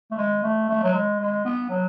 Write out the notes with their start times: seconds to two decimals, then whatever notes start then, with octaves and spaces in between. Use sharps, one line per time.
0.12 A3
0.18 G#3
0.43 A3
0.69 A3
0.83 F#3
0.94 G#3
1.20 G#3
1.45 B3
1.70 F#3